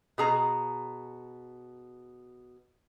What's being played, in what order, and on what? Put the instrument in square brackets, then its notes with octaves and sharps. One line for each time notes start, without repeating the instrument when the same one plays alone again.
[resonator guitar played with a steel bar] B2 G#4 A#5